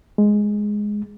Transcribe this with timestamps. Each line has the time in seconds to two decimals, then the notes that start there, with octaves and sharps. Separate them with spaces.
0.18 G#3